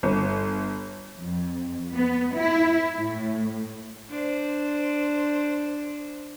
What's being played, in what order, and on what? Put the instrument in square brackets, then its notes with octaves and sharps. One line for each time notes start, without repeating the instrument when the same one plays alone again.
[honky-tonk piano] G1
[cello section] F2
B3
E4
A2
[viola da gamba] D4 C5